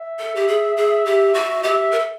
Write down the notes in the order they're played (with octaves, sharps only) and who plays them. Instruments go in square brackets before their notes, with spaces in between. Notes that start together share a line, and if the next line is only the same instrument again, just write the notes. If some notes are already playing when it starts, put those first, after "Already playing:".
Already playing: [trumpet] E5
[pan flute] A4
G4
G#4
G#4
G4
F#4
[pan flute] G4 [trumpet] E5
[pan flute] A#4
A4